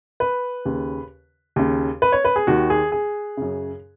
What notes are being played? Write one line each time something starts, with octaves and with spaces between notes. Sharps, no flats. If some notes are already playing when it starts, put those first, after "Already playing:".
B4
D#2 C#3
D#2 C#3
B4
C#5
B4
G#4
D#2 D#3 F#4
G#4
G#4
F#2 C#3